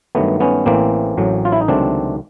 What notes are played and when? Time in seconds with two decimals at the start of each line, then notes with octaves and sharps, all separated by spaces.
0.15 G2 D#3 F#3 A3 B3
0.40 B3 C#4
0.66 A1 A2 E3 A#3 C4
1.18 A1 A2 F#3
1.45 F4
1.52 E4
1.61 D#4
1.68 C#2 C3 D#3 F#3 A3 C4 D4